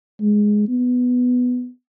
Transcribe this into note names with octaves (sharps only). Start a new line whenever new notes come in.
G#3
B3